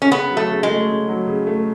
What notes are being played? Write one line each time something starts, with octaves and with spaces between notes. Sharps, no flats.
C#4
C#3 B3
F#3
A3
C#3
G#3
A3
C#3
F#3
C#3
A3